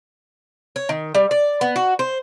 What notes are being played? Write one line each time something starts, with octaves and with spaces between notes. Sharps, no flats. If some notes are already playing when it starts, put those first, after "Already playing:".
C#5
D#3
G3
D5
B3
F#4
C5